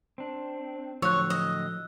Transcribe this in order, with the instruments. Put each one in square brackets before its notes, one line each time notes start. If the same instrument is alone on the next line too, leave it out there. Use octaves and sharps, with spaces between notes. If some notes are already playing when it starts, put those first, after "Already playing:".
[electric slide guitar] C4 D4
[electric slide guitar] A2 D3 F#3 [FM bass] F3 [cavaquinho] C#5 [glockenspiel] E6 F#6
[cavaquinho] D#5